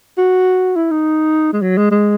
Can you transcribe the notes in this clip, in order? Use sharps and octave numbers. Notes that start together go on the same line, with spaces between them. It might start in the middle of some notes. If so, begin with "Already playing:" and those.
F#4
E4
D#4
G#3
F#3
G#3
G#3